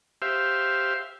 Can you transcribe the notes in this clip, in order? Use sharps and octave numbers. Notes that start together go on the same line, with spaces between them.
G4 C5 E5 F5